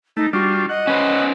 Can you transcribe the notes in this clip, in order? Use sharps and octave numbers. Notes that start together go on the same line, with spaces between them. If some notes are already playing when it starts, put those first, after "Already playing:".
A3 D#4
G3 D4 F4 F#4
D#5 F#5
C#4 B4 C5